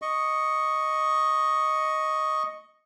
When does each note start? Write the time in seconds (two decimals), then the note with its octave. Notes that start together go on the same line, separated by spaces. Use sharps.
0.02 D#5 C#6